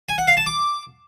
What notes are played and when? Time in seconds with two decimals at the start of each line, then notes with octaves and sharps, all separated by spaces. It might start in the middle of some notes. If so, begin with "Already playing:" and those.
0.09 G#5
0.18 F#5
0.28 F5
0.37 A5
0.46 D6